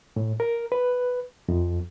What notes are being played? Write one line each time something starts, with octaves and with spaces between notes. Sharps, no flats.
A2
A#4
B4
F2